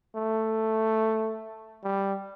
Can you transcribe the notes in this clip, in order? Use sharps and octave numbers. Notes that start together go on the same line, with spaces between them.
A3
G3